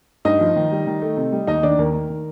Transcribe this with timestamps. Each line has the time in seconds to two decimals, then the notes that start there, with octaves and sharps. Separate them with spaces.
0.25 G2 D#4 D#5
0.41 F3
0.56 D#3
0.71 G3
0.87 D#3
1.02 A3
1.17 C3
1.32 G3
1.47 D#2 D#4 D#5
1.63 D#3 D4 D5
1.79 D#2 A#4
1.94 D#3
2.10 D#3